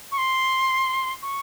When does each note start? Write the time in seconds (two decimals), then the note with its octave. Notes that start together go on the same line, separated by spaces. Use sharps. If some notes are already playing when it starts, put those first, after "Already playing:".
0.12 C#6
0.18 C6
1.22 C#6